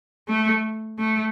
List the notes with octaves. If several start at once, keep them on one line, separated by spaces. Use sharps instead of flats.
A3
A3